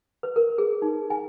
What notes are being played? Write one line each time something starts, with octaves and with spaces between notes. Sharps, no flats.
B4
A#4
G#4
D#4
G#5